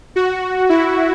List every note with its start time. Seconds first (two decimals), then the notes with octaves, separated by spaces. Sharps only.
0.16 F#4
0.69 E4